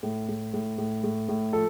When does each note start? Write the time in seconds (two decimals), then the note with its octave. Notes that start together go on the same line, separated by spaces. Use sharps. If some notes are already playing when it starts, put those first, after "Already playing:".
0.03 A2
0.29 A2
0.54 A2
0.78 A2
1.04 A2
1.29 A2
1.53 F3 A4